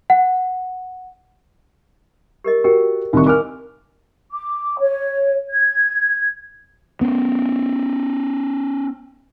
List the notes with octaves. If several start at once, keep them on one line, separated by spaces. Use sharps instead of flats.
F#5
G4 A#4 D#5
F#4 G4 A#4 G5
C2 D#3 C#6
A#4 F5 G#5 D6 F6
D6
C#5
G#6
B3 C#4